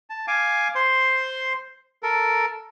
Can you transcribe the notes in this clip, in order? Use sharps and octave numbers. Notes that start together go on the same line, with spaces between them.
A5
F5 G#5 D6
C5 C6
A4 A#4